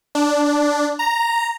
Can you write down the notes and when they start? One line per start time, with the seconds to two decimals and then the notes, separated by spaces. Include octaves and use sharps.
0.15 D4
0.99 A#5